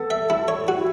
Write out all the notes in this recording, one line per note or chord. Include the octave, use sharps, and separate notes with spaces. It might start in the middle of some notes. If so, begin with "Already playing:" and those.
Already playing: B3 A4
E5
E4
C#5
F#4
E4